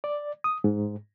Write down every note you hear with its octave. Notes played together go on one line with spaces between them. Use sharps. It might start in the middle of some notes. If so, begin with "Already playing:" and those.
D5
D#6
G#2